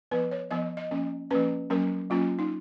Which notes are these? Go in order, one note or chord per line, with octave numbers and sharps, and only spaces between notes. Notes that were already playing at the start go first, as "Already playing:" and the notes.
F3 B3 B4
C#5
F3 B3 D#5
D#5
F3 A#3 C#4
F3 A#3 C#4 B4
F#3 A#3 C#4 A#4
F#3 A#3 C#4 F4
D#4